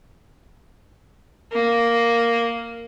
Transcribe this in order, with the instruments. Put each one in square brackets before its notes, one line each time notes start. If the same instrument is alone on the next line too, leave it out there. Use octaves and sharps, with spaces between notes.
[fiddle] A#3